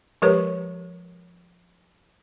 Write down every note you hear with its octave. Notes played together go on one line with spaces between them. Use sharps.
F3 G#3 G4 A#4 B4 C#5